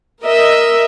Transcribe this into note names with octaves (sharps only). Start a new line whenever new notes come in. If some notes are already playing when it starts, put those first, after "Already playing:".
A#4 D#5 E5